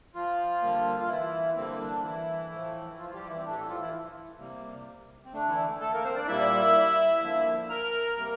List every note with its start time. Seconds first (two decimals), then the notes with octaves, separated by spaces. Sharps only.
0.15 F3 F4
0.62 D3 G3 A#3
1.00 F4
1.08 E3 E4
1.56 D3 G3 A#3 C4
1.80 D4
2.03 E3 E4
2.50 A2 F3 A3
2.97 F3 F4
3.09 F4
3.13 G3 G4
3.29 E3 E4
3.37 C4
3.45 A2 E3 A3 D4
3.51 G4
3.56 A3 A4
3.68 F3 F4
3.80 E3 E4
4.38 C3 G3 A#3
5.25 C4
5.33 D3 A3 D4
5.49 E3 E4
5.80 A3 A4
5.92 A#3 A#4
6.04 C4 C5
6.16 D4 D5
6.27 A#2 G3 A#3 E4 E5
7.22 D3 F3 A#3
7.69 A#4 A#5
8.16 C3 G3 A#3